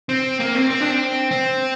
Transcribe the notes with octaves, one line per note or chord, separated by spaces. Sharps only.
C4
A#3
C4
C4
D4
C4
C4